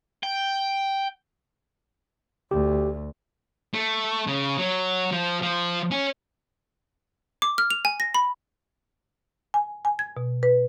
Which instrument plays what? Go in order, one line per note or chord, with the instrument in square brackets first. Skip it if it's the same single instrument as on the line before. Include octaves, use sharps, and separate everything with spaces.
[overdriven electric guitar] G5
[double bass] D2 [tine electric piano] G4
[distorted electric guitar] A3
C#3
F#3
F3
F3
C#4
[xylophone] D6
F6
F7
G#5
A#6
B5
[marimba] G#5
G#5
G#6
B2
B4